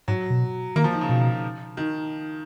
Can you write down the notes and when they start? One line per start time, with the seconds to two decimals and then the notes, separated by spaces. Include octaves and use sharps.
0.08 G#2 F#3
0.30 B2
0.76 D#3 A#3
0.84 F3
0.92 D#3
1.01 C#3
1.09 B2
1.77 D#3